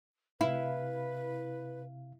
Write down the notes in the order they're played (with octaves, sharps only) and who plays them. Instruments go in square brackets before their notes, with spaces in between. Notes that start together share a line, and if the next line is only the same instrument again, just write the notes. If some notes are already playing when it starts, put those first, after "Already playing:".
[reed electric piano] C3 F5 [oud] E4 [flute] B4